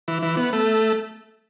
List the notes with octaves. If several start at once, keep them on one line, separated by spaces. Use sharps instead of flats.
E3
E3
B3
A3